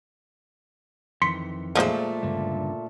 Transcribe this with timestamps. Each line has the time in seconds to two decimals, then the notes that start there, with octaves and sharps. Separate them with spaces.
1.22 F2 D#3 E3 C6 B6 C#7
1.75 A#2 F3 G#3 A3 C5
2.23 C#2 G2 D3